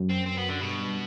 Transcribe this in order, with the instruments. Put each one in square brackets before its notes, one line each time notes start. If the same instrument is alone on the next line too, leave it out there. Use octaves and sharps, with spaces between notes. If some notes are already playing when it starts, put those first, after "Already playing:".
Already playing: [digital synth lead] F#2
[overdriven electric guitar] C4
C4
B3
D3
[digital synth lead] G2 [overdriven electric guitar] B2